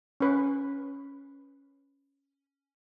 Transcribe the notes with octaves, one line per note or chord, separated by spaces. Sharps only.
C#4 B4